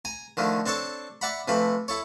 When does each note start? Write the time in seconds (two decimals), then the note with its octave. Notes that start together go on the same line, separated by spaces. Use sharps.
0.05 G#5 A#5
0.37 D3 D#3 F3 A3
0.66 C4 D4 A4 C#5 A5
1.21 D5 E5 F#5 A#5 B5
1.48 C3 E3 F3 A3 B5
1.88 E4 A4 C#5